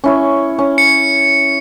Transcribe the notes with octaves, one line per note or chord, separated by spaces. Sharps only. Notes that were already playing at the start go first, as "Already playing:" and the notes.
C#4 E4 C#5
C#4
C#7